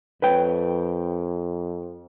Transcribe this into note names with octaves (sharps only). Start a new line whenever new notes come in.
F2 B4 C#5 G5